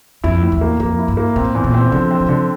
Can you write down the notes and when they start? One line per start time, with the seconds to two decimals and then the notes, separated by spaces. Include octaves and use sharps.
0.24 F2 E4
0.43 A2
0.52 E2
0.61 A#3
0.80 F2 A#3
0.99 E4
1.08 G2
1.17 A#3
1.36 A2 C4
1.55 E2
1.64 A#2
1.74 C4
1.92 D3 F3
2.11 C4
2.20 F3
2.29 D3